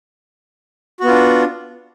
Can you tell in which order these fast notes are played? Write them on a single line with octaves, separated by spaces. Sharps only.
F#4 B3 F4 D4